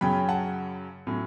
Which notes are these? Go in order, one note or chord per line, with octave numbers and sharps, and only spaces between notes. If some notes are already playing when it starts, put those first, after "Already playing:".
F#2 C#3 F#3 C#4 G5 B5
F#5 A5
A2 F#3 C#4